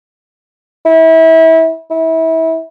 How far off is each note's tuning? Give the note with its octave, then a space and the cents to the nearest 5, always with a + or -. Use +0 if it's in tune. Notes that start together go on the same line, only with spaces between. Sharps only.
E4 -30
E4 -30